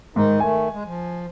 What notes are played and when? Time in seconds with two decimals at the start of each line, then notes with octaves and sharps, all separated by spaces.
0.16 G#2 D#3 D#4
0.40 D#3 A3 G#5
0.72 G#3
0.85 F3